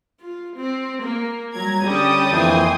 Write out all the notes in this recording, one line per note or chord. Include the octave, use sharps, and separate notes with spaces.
F4
C4
A#3
F#3 G3 A#5 G#6
D3 G3 C#4 G5 A5 D#6 G6
F2 E3 A#3 G#5 C6